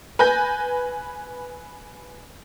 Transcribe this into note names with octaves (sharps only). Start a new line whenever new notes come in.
B4 G#5 G6 A#6